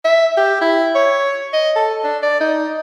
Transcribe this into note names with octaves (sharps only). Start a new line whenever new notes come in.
E5
G4
E4
C#5
D#5
A4
D4
D5
D#4